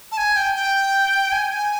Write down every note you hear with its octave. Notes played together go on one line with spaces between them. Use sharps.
A5
G#5
G5
G5
G#5
G#5